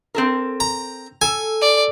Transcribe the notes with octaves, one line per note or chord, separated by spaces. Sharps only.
C4 A4 A#4
A#5
A4 G#5
D5